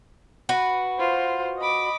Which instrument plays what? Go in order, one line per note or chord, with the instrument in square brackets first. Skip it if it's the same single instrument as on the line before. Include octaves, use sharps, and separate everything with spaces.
[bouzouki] F#4 B4
[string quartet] F4 C5
D#5 B5 D6